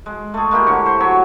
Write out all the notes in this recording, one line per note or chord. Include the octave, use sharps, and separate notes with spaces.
G#3
A3 G#4
G#3 A#3 E4 G4
A2 D3 C#6
C5
F#3 C#5 E5